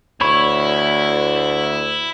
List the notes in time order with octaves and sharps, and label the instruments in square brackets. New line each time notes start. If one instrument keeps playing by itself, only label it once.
[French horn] D2 [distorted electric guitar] E4 [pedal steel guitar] C#5 B5 C#6